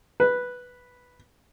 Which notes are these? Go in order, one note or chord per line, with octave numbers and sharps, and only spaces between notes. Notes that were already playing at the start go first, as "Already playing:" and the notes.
B4